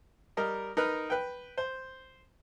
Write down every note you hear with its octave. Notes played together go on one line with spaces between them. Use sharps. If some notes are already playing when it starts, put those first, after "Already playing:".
G3 A#4 D#5
D#4 A#4 B4
B4 G5
C5